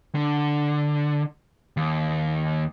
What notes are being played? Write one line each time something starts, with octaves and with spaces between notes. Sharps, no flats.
D3
D#2